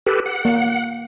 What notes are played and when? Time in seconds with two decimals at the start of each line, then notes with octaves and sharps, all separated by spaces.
0.06 G4 A4 B4
0.26 F#5
0.45 A#3